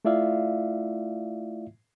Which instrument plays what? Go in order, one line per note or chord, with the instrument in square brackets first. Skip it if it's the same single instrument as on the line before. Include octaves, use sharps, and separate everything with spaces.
[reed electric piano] A3 E4 F4 D5 E5 F5